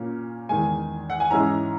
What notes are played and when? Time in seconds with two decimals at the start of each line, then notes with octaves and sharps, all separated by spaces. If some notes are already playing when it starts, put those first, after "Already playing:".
Already playing: A#2 A#3 C#4
0.49 E2 D#3 G#3 G#5
1.10 F#5
1.20 G#5
1.31 G#2 E3 G#3 C#4 E4 A#5